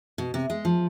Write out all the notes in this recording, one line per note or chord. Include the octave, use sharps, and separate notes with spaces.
B2
C3
G#3
F3